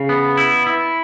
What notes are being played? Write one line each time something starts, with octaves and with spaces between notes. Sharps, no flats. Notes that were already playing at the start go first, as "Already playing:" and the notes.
Already playing: C#3
B3
E4
E4